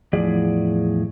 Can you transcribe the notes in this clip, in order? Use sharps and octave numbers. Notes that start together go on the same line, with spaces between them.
E2 A2 F3 G#4 D5